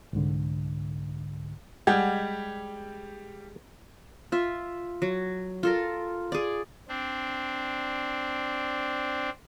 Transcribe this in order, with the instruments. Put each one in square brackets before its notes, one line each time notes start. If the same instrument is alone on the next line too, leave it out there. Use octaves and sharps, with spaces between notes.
[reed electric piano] C2 G#2 D3
[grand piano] G3 G4 G#6 [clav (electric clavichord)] G#3 F#5
[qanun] F4 E5
F#3
F4 A4 A#4
G#4 D5
[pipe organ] C4 D4